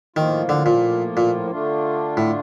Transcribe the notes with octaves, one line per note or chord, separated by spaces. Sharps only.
A2 D#3 F3 A#3 F4
D3
A#2
A#2
D3 A3 D4 F4
A2